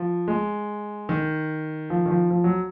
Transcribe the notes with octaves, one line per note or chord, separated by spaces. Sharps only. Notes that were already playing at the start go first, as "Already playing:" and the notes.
Already playing: F3
G#3
D#3
F3
D#3
F3
F3
F#3